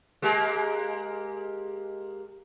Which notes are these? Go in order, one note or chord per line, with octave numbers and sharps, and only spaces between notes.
G#3 A#3 G4